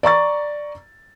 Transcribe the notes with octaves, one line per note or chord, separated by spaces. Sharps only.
D5 A#5 C#6 A6